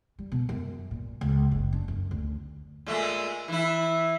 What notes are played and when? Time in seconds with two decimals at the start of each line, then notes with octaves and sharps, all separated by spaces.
0.19 G3
0.32 B2
0.49 F#2
0.91 A#2
1.21 C#2
1.52 F#1
1.73 D4
1.88 F#2
2.11 D2
2.86 A#2 G#3 A3
3.48 E3 E4